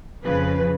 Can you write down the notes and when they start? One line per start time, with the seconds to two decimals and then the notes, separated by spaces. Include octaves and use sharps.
0.24 F2 C#3 F3 B4